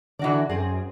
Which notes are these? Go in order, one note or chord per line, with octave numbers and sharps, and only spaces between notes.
D3 E3 F#4 D5
F#2 C4 G#4